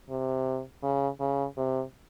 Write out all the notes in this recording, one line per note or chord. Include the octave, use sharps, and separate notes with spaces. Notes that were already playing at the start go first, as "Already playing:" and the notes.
C3
C#3
C#3
C3